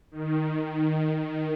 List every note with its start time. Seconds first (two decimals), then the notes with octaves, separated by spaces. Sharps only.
0.11 D#3
0.63 D#3
1.15 D#3